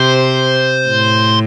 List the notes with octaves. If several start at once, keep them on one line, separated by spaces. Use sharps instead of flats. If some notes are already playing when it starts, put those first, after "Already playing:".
Already playing: C3 C5
A2